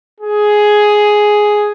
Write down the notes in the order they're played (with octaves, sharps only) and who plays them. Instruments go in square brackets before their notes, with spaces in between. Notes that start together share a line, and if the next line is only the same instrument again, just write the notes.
[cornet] G#4